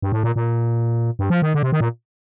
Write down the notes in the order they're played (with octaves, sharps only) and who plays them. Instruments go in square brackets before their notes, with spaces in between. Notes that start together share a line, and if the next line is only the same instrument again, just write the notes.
[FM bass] G2
A2
A#2
A#2
G2
F3
D#3
D3
C3
D#3
A#2